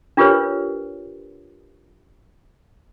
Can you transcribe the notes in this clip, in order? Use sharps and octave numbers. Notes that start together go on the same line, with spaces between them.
D4 F4 G4 A#4 B4 C#5